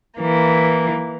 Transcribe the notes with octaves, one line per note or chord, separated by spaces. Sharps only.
E3 A#3